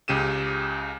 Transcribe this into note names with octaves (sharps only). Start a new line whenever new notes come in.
C#2 C#3 G4 D#7 E7